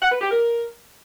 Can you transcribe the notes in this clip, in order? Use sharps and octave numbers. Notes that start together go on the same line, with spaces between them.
F#5
B4
G4
A#4